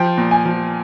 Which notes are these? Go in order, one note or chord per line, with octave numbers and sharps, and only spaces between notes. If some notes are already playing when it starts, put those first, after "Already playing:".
Already playing: F3 G5
A#2
G#5
F3